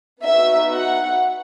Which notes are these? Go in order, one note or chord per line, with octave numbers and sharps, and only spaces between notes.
B3 D#4 F#4 E5
F#5